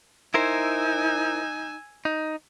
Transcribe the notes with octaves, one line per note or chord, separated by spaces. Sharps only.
D#4 E4 A#4 C5 G#5 E6
D#4